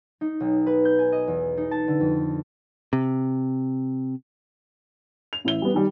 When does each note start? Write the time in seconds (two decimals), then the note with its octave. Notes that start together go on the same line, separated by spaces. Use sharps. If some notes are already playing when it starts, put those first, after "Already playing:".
0.21 D#4
0.40 B1
0.67 B4
0.85 G6
0.99 G#5
1.12 D#5
1.28 E2
1.57 D#4
1.71 A5
1.88 D3
2.00 F2
2.93 C3
5.33 F7
5.44 A1 E4 E5 G7
5.62 G3 B3
5.74 D#3 G3